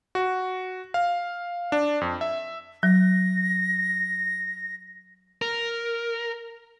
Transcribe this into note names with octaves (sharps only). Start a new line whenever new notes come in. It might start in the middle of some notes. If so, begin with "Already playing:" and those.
F#4
F5
D4
F2
E5
F#3 A#6
A#4